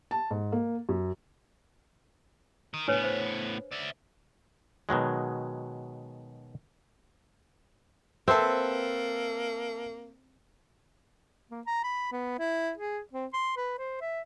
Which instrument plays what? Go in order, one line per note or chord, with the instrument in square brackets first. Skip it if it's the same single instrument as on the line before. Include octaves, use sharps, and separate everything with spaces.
[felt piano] A5
G#2
A#3
F#2
[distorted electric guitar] A#4 D#5
[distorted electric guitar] A2 B3 [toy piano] D4 B4 C#5
[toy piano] C5
[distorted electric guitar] D5 E5
[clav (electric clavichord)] B2 D#3 F#3 G#3
[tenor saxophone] A#3 [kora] C4 [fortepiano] A4 B4 E5
[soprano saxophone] A#3
A#5
B5
B3
E4
G#4
C4
C6
B4
C5
E5